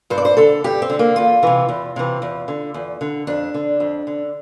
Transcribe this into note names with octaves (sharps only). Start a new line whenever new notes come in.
G2 C5
D5
C5
D3 A4
G2 G4
C4
D3
A#3
E2 F4
C3 E3
E2
C3 E3
E2
D3
E2
D3
F2 D4
D3
F2
D3